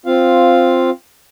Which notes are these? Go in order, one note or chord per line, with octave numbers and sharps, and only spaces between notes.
C4 F4 F5